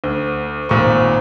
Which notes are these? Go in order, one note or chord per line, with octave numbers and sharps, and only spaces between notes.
D2
G#1 A#2 C#6